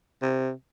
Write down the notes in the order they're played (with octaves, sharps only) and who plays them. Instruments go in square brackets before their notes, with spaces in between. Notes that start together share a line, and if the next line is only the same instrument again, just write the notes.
[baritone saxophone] C3